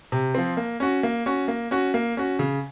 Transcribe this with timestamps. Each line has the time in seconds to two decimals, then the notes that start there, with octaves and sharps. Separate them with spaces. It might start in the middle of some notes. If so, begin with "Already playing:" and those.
0.12 C3
0.34 F3 C4
0.57 A#3
0.80 C#4 F#4
1.03 A#3
1.26 C#4 F#4
1.48 A#3
1.71 C#4 F#4
1.94 A#3
2.17 C#4 F#4
2.39 C#3